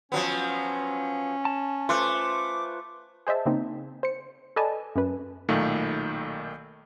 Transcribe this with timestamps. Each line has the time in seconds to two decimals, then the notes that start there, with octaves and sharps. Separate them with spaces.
0.12 F3 F#3 B3 C#4
1.45 A5
1.89 A3 F4 B4 C5 D6
3.27 G#4 C5 D#5 E5 A5
3.46 C#3 A#3 C4 D#4
4.03 C5 C#7
4.56 A4 B4 D5 D#5 G#5 A5
4.96 F#2 C#4 B4
5.49 B1 A#2 D#3 A3